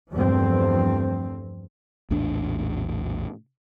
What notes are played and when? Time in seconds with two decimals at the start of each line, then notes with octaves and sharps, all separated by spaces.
0.13 E2 G2 F3 A3 C4
2.10 A#1 E2 A2 D4